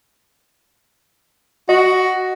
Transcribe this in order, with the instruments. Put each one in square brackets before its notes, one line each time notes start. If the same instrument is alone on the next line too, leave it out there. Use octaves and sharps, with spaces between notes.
[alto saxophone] F#4 [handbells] D#5